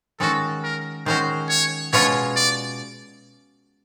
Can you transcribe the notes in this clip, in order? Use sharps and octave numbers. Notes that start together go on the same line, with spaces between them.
D#3 G#3 C#4 F#4 A4
A#4
D#3 G#3 C#4 F#4 C5
C#5
B2 G#3 C#4 F4 C#5
D5